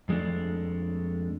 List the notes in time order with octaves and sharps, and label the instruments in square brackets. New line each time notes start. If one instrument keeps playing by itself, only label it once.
[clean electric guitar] F2 G#3 A3 D4